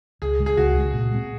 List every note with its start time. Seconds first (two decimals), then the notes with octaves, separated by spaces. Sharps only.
0.22 C#2 G#4
0.39 C#3 G#3
0.46 G#4
0.57 C#2 F#4
0.75 C#3 G#3
0.93 A#2
1.12 G#3 C4